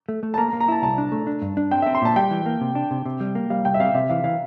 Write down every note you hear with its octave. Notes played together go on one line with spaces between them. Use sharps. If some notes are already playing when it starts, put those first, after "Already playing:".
A3
A3
A5
A#3 A#5
A#5
A#3
A#5
E4 A5
C2 A5
D4
A3
D4
G2
D4
C4 G5
C4 E5
C6
A#2 A5
G3 G5
E3
A#3
C3
D4
C3
C3
G3
A#3
G3 F5
C2 G5
E5
C3 F5
C3 E5
E3 F5
E3 F5